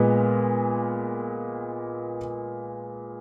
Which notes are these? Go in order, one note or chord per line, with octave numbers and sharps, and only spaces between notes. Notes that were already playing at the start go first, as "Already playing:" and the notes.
Already playing: A#2 G#3 B3